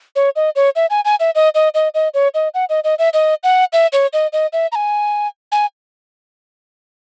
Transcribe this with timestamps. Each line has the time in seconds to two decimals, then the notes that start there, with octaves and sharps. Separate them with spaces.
0.16 C#5
0.36 D#5
0.56 C#5
0.76 E5
0.90 G#5
1.05 G#5
1.20 E5
1.35 D#5
1.55 D#5
1.75 D#5
1.95 D#5
2.14 C#5
2.35 D#5
2.54 F#5
2.69 D#5
2.84 D#5
2.99 E5
3.14 D#5
3.44 F#5
3.73 E5
3.93 C#5
4.13 D#5
4.33 D#5
4.53 E5
4.72 A#5
4.75 G#5
5.52 G#5